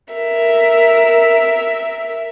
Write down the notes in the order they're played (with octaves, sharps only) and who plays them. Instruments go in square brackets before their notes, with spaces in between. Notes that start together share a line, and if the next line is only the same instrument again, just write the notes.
[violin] A#4 E5